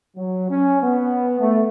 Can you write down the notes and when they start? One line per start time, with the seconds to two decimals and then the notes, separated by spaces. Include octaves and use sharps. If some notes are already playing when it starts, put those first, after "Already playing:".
0.16 F#3
0.49 C#4
0.82 B3
1.39 A3